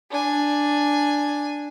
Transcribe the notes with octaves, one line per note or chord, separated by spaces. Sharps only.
D4 G#5